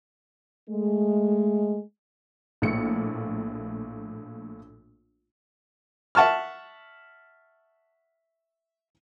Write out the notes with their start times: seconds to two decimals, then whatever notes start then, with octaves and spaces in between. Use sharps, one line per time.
0.70 G#3 A3
2.62 A#1 A2 A#3 C#7
6.15 E5 F#5 A5 C#6 F6